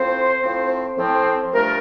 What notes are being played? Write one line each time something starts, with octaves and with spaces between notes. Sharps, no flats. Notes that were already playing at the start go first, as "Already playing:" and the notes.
Already playing: A2 F3 C4 C5
A2 F3 C4
A2 F3 C4
G2 F3 A3 D4 A#4